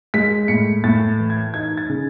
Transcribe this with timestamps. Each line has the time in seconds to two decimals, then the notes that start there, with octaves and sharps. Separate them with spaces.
0.14 G#3 B6
0.48 A2 C#7
0.84 A2 A6
1.19 E3
1.30 G#6
1.54 D#4 G#6
1.77 A6
1.89 C#3